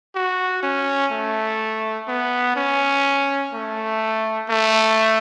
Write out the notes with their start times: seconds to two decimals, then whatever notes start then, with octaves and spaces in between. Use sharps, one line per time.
0.15 F#4
0.63 C#4
1.11 A3
2.08 B3
2.56 C#4
3.53 A3
4.50 A3